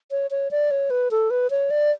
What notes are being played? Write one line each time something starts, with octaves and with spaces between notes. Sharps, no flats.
C#5
C#5
D5
C#5
B4
A4
B4
C#5
D5